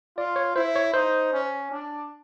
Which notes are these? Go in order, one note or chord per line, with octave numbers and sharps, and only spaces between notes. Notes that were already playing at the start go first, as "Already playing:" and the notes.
F4 D5
C#5
E4 C5
C#5
D#4 C5
C#4
D4